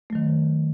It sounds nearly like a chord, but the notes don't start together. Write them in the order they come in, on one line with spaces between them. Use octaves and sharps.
A3 F#3 D#3